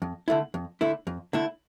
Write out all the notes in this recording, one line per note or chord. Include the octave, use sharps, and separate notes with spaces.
F2
D3 A3 E4
F2
D3 A3 E4
F2
D3 A3 E4